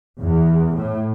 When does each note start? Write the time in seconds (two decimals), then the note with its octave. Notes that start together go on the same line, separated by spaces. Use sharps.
0.20 E2
0.75 A2